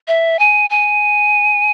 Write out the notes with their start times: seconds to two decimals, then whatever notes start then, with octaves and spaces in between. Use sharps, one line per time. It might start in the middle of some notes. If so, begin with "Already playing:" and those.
0.08 E5
0.39 G#5
0.70 G#5